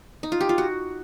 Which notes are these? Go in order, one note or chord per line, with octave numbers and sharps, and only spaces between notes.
D#4
F4
G4
F4
F#4